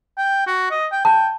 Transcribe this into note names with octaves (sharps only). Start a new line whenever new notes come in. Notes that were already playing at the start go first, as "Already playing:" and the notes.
G5
F#4
D#5
G5
G5 A5